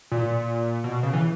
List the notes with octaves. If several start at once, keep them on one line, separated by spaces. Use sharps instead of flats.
A#2
B2
C#3
E3